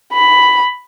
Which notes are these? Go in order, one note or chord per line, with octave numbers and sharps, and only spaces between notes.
B5